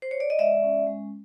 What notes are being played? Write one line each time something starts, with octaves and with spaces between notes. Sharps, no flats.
C5
C#5
D5
D#5
G#3 D5 E5
C#4
G#3